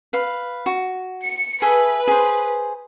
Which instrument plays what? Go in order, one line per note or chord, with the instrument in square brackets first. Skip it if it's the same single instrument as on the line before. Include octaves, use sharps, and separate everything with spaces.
[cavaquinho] B4 F5
F#4
[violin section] C#7
[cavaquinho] G#4 A4 E5 [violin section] B4
[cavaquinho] G#4 C5